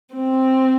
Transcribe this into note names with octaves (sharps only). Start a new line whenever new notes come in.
C4